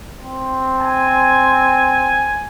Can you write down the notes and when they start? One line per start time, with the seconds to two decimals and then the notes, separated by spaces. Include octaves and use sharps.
0.20 C4
0.79 G#5